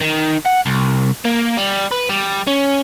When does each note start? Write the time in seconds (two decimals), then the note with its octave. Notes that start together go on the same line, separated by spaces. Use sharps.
0.01 D#3
0.45 F#5
0.66 C2
1.25 A#3
1.57 G3
1.91 B4
2.09 G3
2.47 C#4